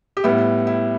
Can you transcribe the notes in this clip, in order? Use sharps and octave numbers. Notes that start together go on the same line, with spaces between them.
G4
A2 G3 B3 E4
E4